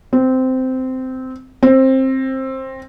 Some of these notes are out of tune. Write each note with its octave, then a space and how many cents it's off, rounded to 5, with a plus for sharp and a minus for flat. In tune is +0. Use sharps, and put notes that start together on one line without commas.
C4 -15
C4 +15